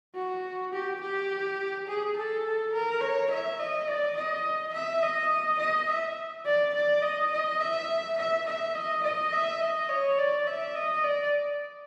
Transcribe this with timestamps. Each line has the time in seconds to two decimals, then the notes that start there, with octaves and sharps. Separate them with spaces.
0.15 F#4
0.73 G4
1.00 G4
1.88 G#4
2.16 A4
2.73 A#4
3.01 C#5
3.31 E5
3.59 D#5
3.88 D5
4.16 D#5
4.74 E5
5.02 D#5
5.59 D#5
5.89 E5
6.45 D5
6.74 D5
7.02 D#5
7.32 D#5
7.61 E5
8.18 E5
8.46 E5
8.75 D#5
9.03 D#5
9.33 E5
9.61 D#5
9.89 C#5
10.18 D5
10.47 E5
10.75 D#5
11.04 D5